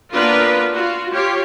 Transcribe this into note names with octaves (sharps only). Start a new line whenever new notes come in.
A#3 B3 D4 F4 A#4 B4
F4 F#4
F4 G4 C#5